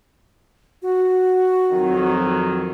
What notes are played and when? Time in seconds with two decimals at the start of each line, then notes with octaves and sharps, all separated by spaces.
0.82 F#4
1.71 F2 D#3 F#3